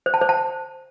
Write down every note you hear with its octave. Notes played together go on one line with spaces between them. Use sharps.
C5
A5
C5
A5